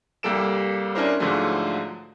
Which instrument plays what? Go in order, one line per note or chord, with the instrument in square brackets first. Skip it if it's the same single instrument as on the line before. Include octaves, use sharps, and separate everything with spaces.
[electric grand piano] C2 G3 A#3 A4 D7 E7
C#4 D4 E4 A#4 C5
G#2 D3 F3 F#3 G#3 A3